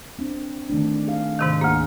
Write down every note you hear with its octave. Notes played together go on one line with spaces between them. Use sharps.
C4 D4
D#3 A3 D4
G#4 F5
G#2 C3 D#3
D2 A#3 G#4